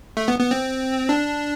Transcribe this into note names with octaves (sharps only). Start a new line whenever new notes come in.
A3
B3
B3
C4
D4